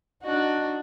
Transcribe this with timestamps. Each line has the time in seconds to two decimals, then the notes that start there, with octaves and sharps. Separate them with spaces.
0.22 D4 D#4 F#4